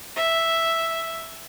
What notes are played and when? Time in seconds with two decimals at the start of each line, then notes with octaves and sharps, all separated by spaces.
0.16 E5